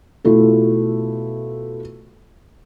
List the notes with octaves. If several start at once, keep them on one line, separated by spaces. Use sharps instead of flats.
B2 A3 E4 F4 A4